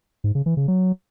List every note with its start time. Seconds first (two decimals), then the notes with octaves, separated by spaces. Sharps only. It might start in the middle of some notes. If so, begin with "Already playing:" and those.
0.24 G#2
0.35 C#3
0.46 E3
0.57 C#3
0.68 F#3